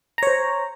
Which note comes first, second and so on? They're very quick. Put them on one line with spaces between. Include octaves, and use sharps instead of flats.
A#5 C#5 C5